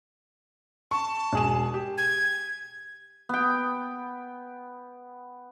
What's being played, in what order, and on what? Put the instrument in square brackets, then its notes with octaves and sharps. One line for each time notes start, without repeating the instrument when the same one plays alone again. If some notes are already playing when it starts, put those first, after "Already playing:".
[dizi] A5 [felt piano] C#6
[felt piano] E1 G#4 E7
G4
[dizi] G#6
[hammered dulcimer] B3 G5